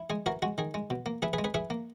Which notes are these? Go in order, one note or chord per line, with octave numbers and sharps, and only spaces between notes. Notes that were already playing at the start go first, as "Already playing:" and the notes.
Already playing: E4
G#3 G#4
E3 F#4 A#4
G#3 F#4
D#3 G#4
G#3
B2
A#3
E4 G#4 B4
G#4 B4
G#3
G#4 B4
E4 G#4 B4
A#3